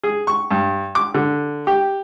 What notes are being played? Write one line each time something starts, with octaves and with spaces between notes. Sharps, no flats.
G#4
C#6
G2
D6
D3
G4